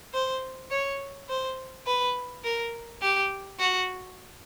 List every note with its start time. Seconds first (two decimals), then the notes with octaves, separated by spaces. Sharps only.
0.13 C5
0.71 C#5
1.29 C5
1.86 B4
2.44 A#4
3.02 G4
3.60 F#4